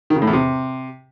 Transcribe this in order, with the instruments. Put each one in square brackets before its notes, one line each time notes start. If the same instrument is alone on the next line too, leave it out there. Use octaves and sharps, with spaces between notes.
[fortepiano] D#3
C#3
A2
E2
C3